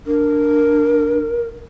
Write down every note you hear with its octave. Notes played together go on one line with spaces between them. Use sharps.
D4 A#4